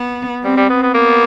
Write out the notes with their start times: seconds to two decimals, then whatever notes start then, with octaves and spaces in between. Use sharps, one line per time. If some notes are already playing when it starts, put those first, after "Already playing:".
Already playing: B3
0.43 G3 C4
0.57 G3
0.70 B3
0.82 B3
0.94 A#3 B3